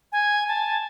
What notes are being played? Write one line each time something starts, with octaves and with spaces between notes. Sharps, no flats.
G#5
A5